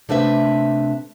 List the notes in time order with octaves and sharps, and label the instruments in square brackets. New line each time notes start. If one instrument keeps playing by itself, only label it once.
[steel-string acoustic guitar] C3 A3 D4 B4 E5